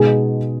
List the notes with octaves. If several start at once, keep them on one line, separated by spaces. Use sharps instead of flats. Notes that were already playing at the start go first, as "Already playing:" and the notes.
Already playing: B2 G#3 B3 D#4 G#4